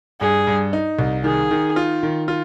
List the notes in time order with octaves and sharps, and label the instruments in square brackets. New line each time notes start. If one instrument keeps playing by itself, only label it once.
[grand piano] G2 [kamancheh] G#4
[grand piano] G2
D#4
C2
[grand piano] D#3 [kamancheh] G#4
[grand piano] D#3
F4
D#3
F4